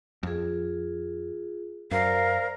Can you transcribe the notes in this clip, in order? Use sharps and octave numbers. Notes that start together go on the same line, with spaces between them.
F2 F4 G#4
F#2 A#4 C5 D5 F5